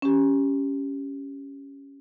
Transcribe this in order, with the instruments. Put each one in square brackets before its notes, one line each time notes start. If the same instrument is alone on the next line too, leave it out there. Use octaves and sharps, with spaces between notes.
[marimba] C#4 G4